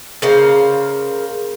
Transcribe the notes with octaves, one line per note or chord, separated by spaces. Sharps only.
C#3 A#3 C5